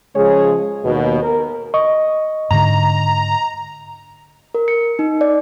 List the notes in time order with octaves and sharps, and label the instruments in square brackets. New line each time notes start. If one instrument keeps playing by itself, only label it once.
[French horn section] C#3 F3 G#3 G#4 C#5
D#2 B2
A#4
[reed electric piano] D#5 C#6
[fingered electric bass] G#2 D3 [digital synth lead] A#5
[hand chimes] A#4
C#7
D#4
D5